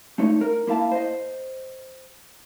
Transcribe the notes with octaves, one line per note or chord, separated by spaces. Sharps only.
A3 D#4 C#5
A#4
A#3 E4 F5 A5
C5 D#5